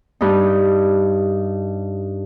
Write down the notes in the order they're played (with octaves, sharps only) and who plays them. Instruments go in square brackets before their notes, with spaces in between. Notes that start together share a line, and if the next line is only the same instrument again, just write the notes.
[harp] G2 D#4